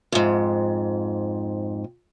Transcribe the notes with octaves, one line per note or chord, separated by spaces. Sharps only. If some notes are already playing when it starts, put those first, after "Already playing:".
F2 G#2